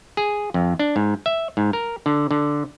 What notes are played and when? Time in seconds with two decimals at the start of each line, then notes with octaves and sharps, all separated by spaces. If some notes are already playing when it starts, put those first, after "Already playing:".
0.17 G#4
0.54 F2
0.79 D4
0.96 G#2
1.26 E5
1.57 G#2
1.73 A#4
2.06 D3
2.31 D3